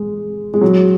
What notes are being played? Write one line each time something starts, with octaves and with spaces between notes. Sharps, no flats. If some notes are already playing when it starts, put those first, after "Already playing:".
Already playing: G#3
G#3
F#3